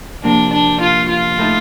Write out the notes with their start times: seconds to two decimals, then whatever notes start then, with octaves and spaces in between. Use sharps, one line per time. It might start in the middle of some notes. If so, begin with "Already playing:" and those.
0.23 C3 F3 A#3 D4
0.53 D4
0.81 F4
1.09 F4
1.38 A2 A3 D#4 A4 D#5